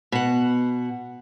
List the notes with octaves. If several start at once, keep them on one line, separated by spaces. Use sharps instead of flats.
B2 F#5